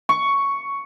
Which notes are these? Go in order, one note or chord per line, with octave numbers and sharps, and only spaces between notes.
C#6